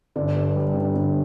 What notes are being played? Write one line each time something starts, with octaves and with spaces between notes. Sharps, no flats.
G1 D5
G2
G3
G1
G1